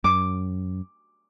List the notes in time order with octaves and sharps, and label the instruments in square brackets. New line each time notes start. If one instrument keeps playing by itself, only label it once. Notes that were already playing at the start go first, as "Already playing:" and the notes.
[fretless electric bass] F#2 [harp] D6